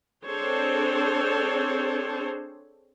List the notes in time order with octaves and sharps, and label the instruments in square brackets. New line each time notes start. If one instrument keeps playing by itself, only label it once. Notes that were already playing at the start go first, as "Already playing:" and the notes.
[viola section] C4 D4 G#4 A4 C5 C#5